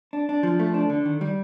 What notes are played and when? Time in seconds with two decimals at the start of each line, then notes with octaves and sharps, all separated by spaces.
0.13 D4
0.29 D4
0.43 F3
0.59 A3
0.74 D4
0.90 D3
1.05 D#3
1.21 G3